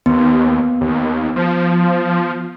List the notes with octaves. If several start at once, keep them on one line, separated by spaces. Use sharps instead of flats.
D#2 B3
D#2
F3